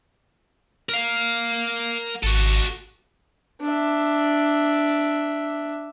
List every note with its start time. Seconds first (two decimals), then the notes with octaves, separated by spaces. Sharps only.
0.89 A#4 F5
2.23 G#1 F#4 A4
3.61 D4 E5